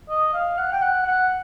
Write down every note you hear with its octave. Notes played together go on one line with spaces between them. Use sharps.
D#5
F5
F#5
G5
F#5
F#5